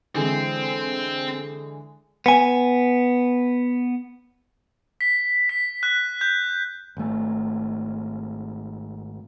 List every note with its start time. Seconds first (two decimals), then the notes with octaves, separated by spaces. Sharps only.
0.15 D3 E3 G#3 C4
2.26 B3 G#5
5.01 B6
5.49 B6
5.83 F#6
6.21 G6
6.97 G#1 A3